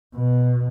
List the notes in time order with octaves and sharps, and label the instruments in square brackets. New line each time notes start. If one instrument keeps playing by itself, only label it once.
[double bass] B2